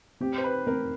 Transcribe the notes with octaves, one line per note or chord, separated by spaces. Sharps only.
C4 G4
C5
B4
C4 A#4